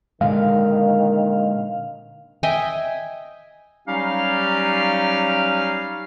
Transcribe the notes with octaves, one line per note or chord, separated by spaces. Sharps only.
A#2 D3 D#3 G#3 F5
D#5 E5 G5 G#5
F#3 G3 C#4 D#4 G4 F5